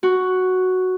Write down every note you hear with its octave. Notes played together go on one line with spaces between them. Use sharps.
F#4